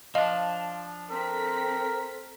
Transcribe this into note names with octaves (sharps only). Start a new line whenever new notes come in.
F3 D4 D#5 F5
C4 A4 A#4 B6